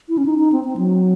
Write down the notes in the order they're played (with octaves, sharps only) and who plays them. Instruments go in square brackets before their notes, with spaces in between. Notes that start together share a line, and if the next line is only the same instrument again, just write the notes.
[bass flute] E4
C#4
D#4
D#4
C4
C4
F#3